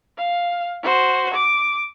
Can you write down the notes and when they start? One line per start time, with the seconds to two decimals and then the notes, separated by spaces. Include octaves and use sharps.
0.18 F5
0.83 F#4 C5
1.34 D6